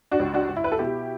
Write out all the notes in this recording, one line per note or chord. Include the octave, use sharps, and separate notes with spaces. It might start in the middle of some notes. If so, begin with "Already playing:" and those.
D4 F#4
C#2
D4 F#4
C#2
E4
B4
A4
B2 E4 G4